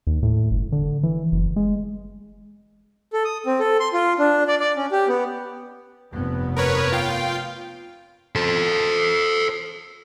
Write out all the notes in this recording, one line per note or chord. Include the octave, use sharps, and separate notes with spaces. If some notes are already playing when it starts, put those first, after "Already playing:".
D#2
A2
G1
D3
E3
F#1
G#3
A4
D#6
C4
A4
C6
F4
D4
D5
D5
C#4
G4
B3
F1 G2 B3
A#4 B4 C#5
F4 F5 G5
A4 C5